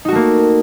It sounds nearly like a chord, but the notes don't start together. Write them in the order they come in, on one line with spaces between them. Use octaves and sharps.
D#4 F#4 A3 A#3